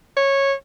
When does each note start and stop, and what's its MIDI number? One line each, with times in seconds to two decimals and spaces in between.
0.17 0.53 73